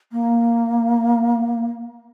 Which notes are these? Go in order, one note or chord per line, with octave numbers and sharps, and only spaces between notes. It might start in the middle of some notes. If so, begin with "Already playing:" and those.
A#3